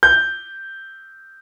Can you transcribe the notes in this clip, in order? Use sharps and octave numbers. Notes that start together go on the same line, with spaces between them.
G6